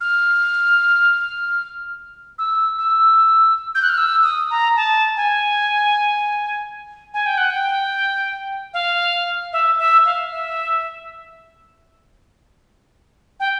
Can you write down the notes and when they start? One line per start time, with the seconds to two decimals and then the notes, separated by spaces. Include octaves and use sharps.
0.01 F6
2.38 E6
2.78 E6
3.75 G6
3.82 F#6
3.89 F6
3.98 E6
4.23 D#6
4.50 A#5
4.76 A5
5.16 G#5
7.14 G#5
7.26 G5
7.38 F#5
7.50 G5
8.74 F5
9.53 E5
9.79 E5
10.05 F5
10.32 E5
13.40 G5